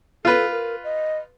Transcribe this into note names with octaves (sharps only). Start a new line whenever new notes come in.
F4 A4 B4
A#4
D#5